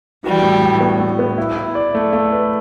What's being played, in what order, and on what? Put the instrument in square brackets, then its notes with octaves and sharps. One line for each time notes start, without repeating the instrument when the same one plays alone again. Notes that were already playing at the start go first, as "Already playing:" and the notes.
[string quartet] E3 G3 [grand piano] F#4
[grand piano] A2
A2
B3
A2
B3
E4
E4
D5
A3
A3
B4